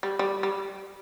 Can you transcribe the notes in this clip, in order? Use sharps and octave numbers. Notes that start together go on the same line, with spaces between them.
G3
G3
G3